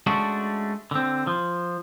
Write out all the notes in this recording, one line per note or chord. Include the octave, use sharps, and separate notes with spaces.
G#3 A3 C#4 D4 F#4
D3 C4
F3